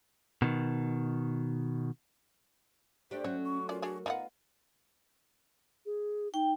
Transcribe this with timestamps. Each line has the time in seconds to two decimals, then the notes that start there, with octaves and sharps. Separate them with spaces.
0.42 B2 D#3
3.11 A3 D4 G4 C5
3.24 F#3 A3 C#4 C#5
3.44 C#6
3.69 C#4 F4 A#4 D5
3.82 D4 F#4 G#4
4.06 B3 D#4 F4 F5 F#5
5.86 G#4
6.34 D#4 G5